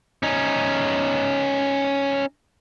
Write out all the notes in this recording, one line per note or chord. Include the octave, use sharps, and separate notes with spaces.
C#4 D#4